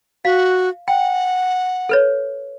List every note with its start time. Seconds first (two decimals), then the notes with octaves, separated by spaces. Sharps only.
0.25 F#4 F5
0.88 F#5 G5
1.89 A4 B4 C#5